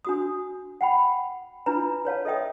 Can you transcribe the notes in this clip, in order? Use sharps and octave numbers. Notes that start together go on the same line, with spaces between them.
D4 F#4 D#6
F#5 G5 B5
D4 E4 F4 B4 A#5
B4 C#5 F5 A5
A4 D#5 E5 G5 D#6